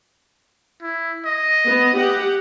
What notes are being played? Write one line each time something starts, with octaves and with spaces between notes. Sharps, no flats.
E4
D#5
B3
G4 F#5